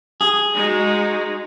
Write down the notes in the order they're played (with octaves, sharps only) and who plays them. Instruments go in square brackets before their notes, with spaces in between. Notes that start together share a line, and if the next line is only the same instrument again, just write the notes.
[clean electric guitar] G#4
[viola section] G#3 D#4 F#4